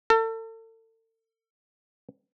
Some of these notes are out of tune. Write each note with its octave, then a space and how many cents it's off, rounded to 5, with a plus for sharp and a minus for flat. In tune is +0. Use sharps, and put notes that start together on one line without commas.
A4 +40